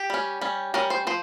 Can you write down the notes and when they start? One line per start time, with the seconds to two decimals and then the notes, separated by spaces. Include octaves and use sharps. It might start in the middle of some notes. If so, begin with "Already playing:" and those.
Already playing: G4
0.10 G3 C#4
0.41 G3 C#4
0.74 G3 C#4 A#4
0.90 C5
1.07 F3 C5